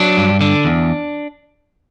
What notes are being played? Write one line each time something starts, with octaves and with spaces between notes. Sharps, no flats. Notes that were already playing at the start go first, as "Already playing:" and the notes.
Already playing: F#3 D4
G2
D3 D4
E2